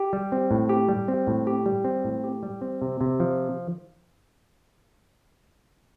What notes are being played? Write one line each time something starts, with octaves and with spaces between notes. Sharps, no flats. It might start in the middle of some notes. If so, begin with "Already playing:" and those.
Already playing: G4
G3
C4
A2
G4
G3
C4
A2
G4
G3
C4
A2
G4
G3
C4
C3
C3
F3